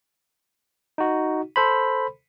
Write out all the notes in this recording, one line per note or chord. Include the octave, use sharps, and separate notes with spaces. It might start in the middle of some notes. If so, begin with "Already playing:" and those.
D#4 F#4
A4 C5 B5